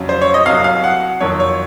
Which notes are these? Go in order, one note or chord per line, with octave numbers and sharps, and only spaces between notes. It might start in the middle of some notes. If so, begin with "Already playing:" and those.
Already playing: F2 C#3 F#3
C5
C#5
D#5
C2 C3 F#3 F5
F5
F#5
F2 D#3 F#3 C#5
C#5